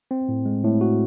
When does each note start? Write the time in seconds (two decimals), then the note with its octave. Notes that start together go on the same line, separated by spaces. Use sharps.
0.11 C4
0.29 A2
0.46 G#3
0.64 A2
0.81 F#4